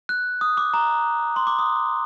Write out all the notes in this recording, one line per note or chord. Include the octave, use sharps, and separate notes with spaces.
F#6
D#6
D6
A#5
C6
D6
D#6